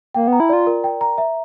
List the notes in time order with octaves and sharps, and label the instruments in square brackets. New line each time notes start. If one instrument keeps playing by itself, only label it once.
[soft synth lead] A#3 [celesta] G5
[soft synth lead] B3 [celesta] A#5
[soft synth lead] E4
[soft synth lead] F4 [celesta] D5
[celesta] A#4
G5
A#5
E5